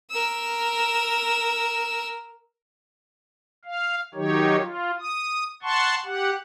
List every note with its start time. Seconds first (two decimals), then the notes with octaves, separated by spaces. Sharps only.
0.11 A#4 E6
3.65 F5
4.14 D#3 F#3 D#4 G4 C#5
4.60 F4
4.99 D#6
5.63 F#5 A5 C6 C#6
6.05 G4 F#5